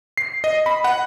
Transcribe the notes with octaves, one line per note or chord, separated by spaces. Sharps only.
C7
D#5
B5
F#5